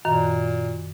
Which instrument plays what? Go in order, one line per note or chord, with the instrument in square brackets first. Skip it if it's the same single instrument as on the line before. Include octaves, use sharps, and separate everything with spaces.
[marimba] F#2 D#3 [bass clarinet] A#2